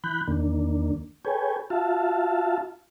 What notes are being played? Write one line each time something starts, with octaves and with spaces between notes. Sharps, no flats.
E3 B5 F#6 G6
E2 D#3 A#3 D4
G#4 A4 B4 C#5 G5 G#5
F4 F#4 E5 F5 A5